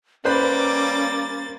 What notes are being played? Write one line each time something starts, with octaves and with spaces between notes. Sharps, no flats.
G3 A#3 C#4 B4 C5 B5 D6 A6